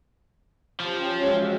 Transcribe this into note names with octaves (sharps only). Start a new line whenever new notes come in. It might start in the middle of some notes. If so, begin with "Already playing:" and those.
F3 C#4 G4
G#3 F#4 C#5 E5